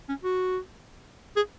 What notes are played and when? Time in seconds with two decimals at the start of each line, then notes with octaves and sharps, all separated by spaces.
0.09 C#4
0.24 F#4
1.36 G#4